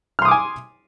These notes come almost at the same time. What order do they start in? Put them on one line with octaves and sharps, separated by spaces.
F6 C6 D#6 D6 G#5